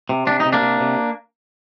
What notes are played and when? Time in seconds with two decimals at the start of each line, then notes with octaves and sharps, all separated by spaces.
0.09 C3
0.27 C3 D4
0.40 D#4
0.45 C3
0.53 A#3 D4
0.62 C3
0.80 C3